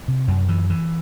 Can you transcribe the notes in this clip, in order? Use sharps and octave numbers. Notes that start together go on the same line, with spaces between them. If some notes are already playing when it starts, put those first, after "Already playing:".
C3
F#2
E3
E3